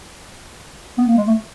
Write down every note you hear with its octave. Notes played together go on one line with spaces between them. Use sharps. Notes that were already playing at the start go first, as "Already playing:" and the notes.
B3
A#3
G#3
A3